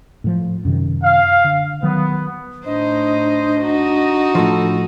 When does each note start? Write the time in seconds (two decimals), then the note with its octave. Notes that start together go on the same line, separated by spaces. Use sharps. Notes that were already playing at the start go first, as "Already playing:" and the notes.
0.24 A2 F3
0.65 F#2 C3 D#3
1.03 F5
1.44 D3
1.83 D#3 F#3 B3
2.66 A2 D4 D#4 C5 D#5
3.61 D#4 F#4
4.35 A2 F3 A4